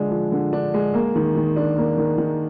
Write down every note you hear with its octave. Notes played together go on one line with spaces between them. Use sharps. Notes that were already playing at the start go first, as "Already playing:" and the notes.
Already playing: D3 F3 G#3 D4
F3
D3
D4
G#3
A#3
D#3
D#3
D4
A#3
D#3
D#3